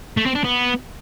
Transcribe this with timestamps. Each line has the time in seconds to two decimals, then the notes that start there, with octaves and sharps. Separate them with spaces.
0.17 A3
0.26 C4
0.35 D4
0.44 B3